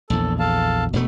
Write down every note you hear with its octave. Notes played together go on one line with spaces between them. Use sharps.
A#1 E2 A4
A4 F5 A5
E1 B2 A3